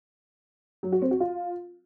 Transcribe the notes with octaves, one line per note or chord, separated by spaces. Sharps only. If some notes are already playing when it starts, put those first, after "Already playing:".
F#3
F#4
C4
F#4
F4